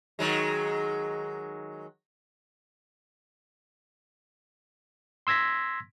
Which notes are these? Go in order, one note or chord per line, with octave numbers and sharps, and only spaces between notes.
D#3 F#3 G#3
C6 E6 G#6 A#6 B6